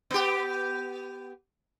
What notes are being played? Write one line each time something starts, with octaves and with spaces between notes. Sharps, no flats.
B3 G4